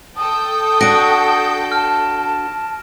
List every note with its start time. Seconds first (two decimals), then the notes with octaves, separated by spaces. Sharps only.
0.17 A4 G5 D#6 G6
0.81 D4 F#4 A#6 D7
1.72 A5 F6